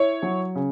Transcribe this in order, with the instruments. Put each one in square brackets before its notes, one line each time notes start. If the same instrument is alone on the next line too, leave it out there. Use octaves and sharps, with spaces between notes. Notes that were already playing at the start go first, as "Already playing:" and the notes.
Already playing: [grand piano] E4 C#5
F#3
C#3